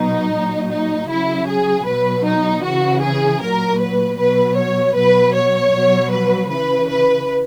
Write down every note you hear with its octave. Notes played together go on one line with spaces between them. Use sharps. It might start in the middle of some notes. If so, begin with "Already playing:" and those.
Already playing: B2 F#3 D#4
A#2 F#3
D#4
C#3 F#3 E4
G#4
B2 F#3 B4
D#4
C#3 E3 F#4
G#4
A#2 F#3 A#4
B4
B2 F#3 B4
C#5
B2 F#3 B4
C#5
B2 F#3
B4
C#3 E3 B4
B4